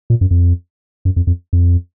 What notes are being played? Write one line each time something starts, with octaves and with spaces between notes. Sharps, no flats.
A#2
F#2
F2
F#2
F2
F2
F2